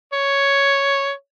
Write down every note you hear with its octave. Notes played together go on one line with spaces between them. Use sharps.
C#5